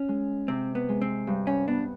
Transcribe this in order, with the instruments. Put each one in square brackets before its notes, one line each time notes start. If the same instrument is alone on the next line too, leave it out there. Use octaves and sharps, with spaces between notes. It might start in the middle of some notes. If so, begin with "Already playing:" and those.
Already playing: [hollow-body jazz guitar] C#4
[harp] G#3
[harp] C3 [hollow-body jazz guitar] C4
[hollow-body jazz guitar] B3
[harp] G#3
[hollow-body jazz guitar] C4
[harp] G2
[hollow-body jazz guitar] C#4
[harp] B3 [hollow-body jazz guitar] D4